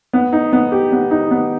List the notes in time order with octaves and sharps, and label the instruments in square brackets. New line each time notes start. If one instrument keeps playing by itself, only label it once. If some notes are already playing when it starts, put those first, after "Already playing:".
[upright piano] B3
D#4
B3
G4
B3
D#4
B3